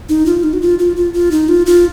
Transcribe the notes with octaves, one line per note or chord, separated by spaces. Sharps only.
D#4
F4
D#4
F#4
F4
F4
F4
F4
D#4
F4
F4